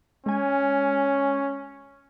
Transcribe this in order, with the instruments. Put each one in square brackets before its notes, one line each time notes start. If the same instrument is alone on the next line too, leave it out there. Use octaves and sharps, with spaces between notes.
[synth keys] G#3 G#5 [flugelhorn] C#4